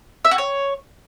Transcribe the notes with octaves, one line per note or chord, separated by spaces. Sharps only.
E5
F#4
C#5